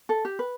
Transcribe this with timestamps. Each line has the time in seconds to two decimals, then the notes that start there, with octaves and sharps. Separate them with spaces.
0.09 A4
0.25 G4
0.39 B4